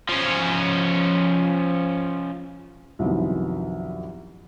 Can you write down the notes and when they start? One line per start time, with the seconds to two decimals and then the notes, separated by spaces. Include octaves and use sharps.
0.09 F3 C#4
2.99 C2 F#2 D#3 F3 B3